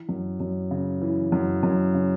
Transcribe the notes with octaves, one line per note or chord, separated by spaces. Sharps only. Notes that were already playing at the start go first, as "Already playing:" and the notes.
Already playing: E3
F#2
F#2
C#3
E3
F#2
F#2
C#3